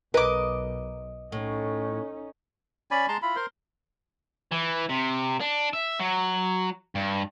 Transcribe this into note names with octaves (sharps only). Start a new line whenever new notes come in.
B1 A#4 B4 D#5 D6
A2 C#4 D#4
C#4 D5 G#5 B5
G#3 A5 A#5 C6
E4 F4 B5
A#4 C5 C6
E3
C3
D4
E5
F#3
G2